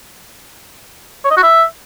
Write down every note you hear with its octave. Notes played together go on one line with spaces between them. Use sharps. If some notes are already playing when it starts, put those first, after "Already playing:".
C#5
D#5
F#4
E5